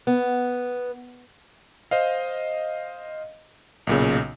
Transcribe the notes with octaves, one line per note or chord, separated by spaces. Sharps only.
B3
C5 D#5 F5
B1 A#2 C#3